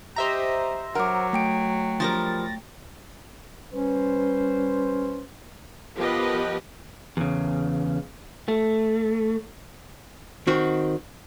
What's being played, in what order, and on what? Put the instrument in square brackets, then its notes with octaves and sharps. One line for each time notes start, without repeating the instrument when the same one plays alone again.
[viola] G4 D#5 [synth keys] C5 E5 A#5
[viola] F#3 [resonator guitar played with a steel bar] A#4 [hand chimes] F#5 D6
[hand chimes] A3 G5 D7
[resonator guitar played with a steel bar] F3 G3 A#4 [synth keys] A6 A#6
[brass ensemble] G3 B4 C5 [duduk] C#4
[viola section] F3 B3 G4 A#4 B4 D#5
[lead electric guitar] E2 C#3
A3
[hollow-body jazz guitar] D#3 C4 F#4